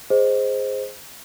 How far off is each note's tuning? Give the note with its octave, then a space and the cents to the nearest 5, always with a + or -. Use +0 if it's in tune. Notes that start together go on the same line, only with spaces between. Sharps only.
G#4 +0 C5 +0 D#5 +0